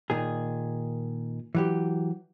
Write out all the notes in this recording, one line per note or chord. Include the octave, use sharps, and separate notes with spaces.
A#2 D#3 G#4
E3 F#3 G4